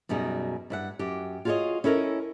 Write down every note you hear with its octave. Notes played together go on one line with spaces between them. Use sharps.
F#2 B2 G3 D#4 G#4
G2 E5 F#5
F#2 G4
F4 F#4 G#4 C5 C#5 D#5
C#4 E4 A4 A#4 C5 D#5